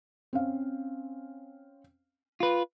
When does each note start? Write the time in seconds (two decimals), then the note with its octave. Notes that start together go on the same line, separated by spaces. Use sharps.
0.33 C4 C#4 F5
2.40 F4 B4